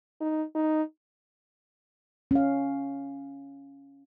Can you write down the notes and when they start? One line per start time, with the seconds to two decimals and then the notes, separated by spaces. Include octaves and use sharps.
0.20 D#4
0.55 D#4
2.31 C#4 F5